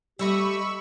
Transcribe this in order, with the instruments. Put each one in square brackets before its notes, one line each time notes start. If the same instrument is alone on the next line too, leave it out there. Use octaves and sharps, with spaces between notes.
[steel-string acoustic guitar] G3 A3 D#5 [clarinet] G4 [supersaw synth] B5 C#6 E6